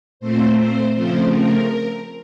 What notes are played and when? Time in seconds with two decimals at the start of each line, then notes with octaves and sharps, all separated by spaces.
0.20 A#2 A3 C4 C5
0.57 C5
0.94 C#3 F3 A3 C4 C5
1.31 A#4